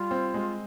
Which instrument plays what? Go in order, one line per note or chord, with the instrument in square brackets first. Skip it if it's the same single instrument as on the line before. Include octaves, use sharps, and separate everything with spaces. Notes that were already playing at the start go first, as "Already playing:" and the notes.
Already playing: [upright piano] G3 [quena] F4
[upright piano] C4
G#3